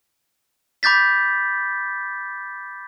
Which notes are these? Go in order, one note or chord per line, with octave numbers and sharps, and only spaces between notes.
B5 D6 G6 A6 B6